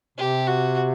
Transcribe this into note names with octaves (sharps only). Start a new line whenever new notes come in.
C3 G4
F#4